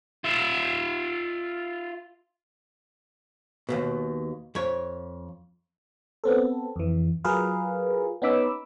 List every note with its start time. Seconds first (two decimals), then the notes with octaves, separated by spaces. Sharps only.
0.24 F4 E5
3.69 D#2 G#2 B2
4.55 F2 C#5
6.24 B3 C4 A4
6.76 F2 E3
7.24 F#3 F4 G#4 A#4 B4 F5
8.22 B3 C#4 D#4 B5 D6 E6